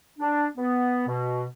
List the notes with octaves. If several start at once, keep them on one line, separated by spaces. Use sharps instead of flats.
D4
B3
B2